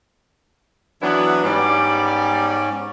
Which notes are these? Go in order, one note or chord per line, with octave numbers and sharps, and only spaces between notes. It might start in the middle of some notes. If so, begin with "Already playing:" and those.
E3 F#3 B3 D4 E4
G#2 G3 B3 C#4 D5